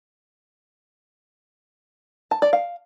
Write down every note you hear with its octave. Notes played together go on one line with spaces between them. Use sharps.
A5
D5
F5